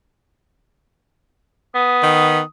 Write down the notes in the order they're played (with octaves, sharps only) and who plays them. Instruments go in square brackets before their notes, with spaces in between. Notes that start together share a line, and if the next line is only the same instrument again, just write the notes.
[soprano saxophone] B3 [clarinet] D#6
[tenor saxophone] D#3